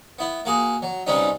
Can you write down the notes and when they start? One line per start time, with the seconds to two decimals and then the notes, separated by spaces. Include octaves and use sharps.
0.19 B3 E4
0.45 A#3 F#4 G#4
0.82 F#3
1.07 B1 C3 G3 C4 C#4 D#4